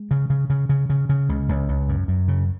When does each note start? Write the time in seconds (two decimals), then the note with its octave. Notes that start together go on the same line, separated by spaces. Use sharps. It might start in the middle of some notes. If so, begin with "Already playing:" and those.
Already playing: G#3
0.11 C#3
0.30 C#3
0.50 C#3
0.69 C#3
0.90 C#3
1.09 C#3
1.29 C#2
1.49 C#2
1.69 C#2
1.89 F#2
2.08 F#2
2.28 C#3